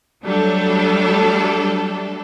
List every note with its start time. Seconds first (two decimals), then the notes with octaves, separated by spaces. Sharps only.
0.25 F#3 G3 A3 D4 A4